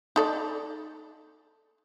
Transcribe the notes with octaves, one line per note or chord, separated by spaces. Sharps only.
D#4 A4 D5